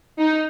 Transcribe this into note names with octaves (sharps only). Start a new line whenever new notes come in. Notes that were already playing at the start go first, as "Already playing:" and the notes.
D#4